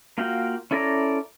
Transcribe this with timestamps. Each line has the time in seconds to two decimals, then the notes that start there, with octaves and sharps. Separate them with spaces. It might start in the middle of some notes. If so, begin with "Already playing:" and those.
0.18 A#3 F4 F#4 F5 G5
0.71 C#4 E4 A4 D5 A#5